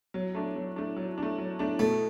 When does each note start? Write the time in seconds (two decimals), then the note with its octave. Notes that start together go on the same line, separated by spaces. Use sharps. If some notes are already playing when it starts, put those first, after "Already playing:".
0.14 F#3
0.35 A3 D4
0.56 F#3
0.76 A3 D4
0.96 F#3
1.18 D4
1.23 A3
1.38 F#3
1.59 A3 D4
1.79 B2 A3